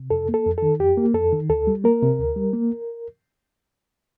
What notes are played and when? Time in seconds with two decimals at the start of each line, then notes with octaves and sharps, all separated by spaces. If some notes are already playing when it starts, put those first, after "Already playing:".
Already playing: C3
0.10 F2 A4
0.29 A#3
0.34 A4
0.46 F2
0.58 D#3 A4
0.80 F2 G4
0.97 A#3
1.14 F2 A4
1.33 D#3
1.50 D2 A4
1.67 G3
1.84 A#3 A#4
2.02 C3
2.19 D2
2.36 G3
2.53 A#3